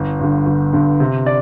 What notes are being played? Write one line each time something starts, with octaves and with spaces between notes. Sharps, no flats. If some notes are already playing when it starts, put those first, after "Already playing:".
Already playing: G1
G2 D3
G1
G2 D3
C3
D5